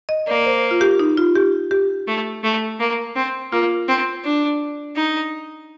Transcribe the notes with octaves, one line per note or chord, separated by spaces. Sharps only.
D#5
A#3 D5
C5
F4
G4
D#4
F4
G4
G4
A3
A3
A#3
C4
A#3 F4
C4
D4
D#4